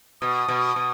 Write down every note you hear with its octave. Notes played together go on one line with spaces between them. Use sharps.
B2 D#6
B2
B2